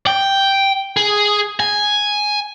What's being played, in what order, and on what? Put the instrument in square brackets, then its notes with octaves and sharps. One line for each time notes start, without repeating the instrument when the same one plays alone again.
[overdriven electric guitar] G5
G#4
G#5